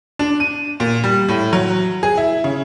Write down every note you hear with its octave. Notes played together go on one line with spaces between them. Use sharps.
D4
D#7
A#2
G3
A2
F#3
G#4
E4
C#3